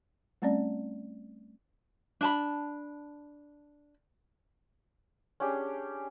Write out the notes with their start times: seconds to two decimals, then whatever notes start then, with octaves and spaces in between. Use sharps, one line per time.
0.42 G3 A3 C4 C#4 D5
2.21 D4 A5 B5
5.40 C#4 D4 G4 G#4